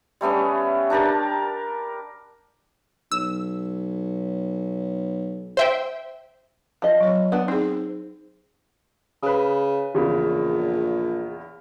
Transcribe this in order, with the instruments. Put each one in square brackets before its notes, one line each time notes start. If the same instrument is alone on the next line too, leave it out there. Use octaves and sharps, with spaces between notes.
[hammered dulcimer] G3 A3 B3 C#4
D4 G4 A#4 A5
[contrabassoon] B1 [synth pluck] E6
[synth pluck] C5 E5 G5
[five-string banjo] F3 D#5
[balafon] F#3 C#5
[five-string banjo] B3 D4
[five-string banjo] C4 [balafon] D#4 G#4
[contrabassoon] C#3 [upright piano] B4 D#6
[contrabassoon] A#1 [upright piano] E2 C#3